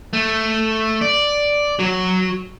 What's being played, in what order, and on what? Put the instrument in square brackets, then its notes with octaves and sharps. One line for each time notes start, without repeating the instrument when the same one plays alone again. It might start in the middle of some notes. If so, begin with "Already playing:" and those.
[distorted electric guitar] A3
D5
F#3